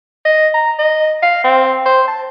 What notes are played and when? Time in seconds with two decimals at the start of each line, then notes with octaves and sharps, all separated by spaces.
0.25 D#5
0.54 A#5
0.79 D#5
1.23 F5
1.44 C4
1.86 C5
2.08 A5